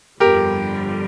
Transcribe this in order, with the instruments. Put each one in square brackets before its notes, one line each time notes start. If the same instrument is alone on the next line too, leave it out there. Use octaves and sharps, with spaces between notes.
[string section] G1 F2 D3 G3 [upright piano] G4 A#4